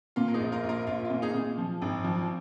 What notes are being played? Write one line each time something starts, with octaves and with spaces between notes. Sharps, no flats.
A#2 F4
A#4
D#4 G#4
A#1
F4 A#4
A#1 F4 A#4
A#1 F4
F4
A#2
D#4 G#4
A#2
F3
G#1
F3